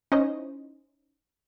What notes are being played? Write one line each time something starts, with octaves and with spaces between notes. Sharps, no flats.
C#4 D#4 E4 C5 C#5 D#5